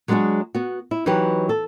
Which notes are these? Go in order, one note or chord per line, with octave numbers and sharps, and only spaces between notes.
F#3 G#3 B3 D4 F#4 G#4
B3 F#4
E4
E3 F#3 D#4 G4 B4
A4